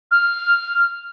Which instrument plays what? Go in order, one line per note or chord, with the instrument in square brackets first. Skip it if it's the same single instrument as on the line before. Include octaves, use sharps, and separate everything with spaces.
[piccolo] F6